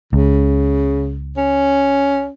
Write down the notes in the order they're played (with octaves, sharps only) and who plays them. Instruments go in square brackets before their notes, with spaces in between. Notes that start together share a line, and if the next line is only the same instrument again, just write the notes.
[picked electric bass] C#2 [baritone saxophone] C#3
[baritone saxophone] C#4